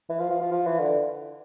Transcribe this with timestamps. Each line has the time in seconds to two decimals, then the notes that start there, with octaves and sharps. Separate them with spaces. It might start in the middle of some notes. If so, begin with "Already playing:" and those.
0.09 E3
0.19 F3
0.30 F3
0.41 F3
0.51 F3
0.66 E3
0.80 D3